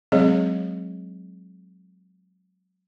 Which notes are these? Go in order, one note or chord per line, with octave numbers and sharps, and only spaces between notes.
F#3 G#3 C4 G#4 C#5 D#5